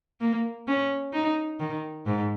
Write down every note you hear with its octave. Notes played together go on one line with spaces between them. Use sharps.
A#3
C#4
D#4
D#3
G#2